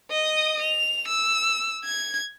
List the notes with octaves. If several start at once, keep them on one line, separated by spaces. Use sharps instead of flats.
D#5 D#6
F7
E6
G#6